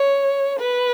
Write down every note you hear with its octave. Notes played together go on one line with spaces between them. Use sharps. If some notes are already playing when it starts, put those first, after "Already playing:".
Already playing: C#5
B4